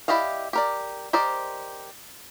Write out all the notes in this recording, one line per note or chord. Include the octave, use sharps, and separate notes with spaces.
E4 G4 D5 D#5 F5
G4 A#4 D5
G4 A#4 C5 D5 D#5